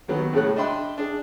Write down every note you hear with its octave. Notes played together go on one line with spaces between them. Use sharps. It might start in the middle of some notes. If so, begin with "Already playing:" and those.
D#2 D#3 F#3 B3
A2 C#3 G#3 A3 C#5 F#6
D4 D#5 E5 G5 B5 C6
D4 G#4